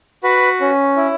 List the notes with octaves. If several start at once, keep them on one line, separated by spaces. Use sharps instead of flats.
F#4 B4
C#4
E4